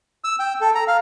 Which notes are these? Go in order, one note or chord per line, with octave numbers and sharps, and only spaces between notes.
E6
G5
A4
A#5
F5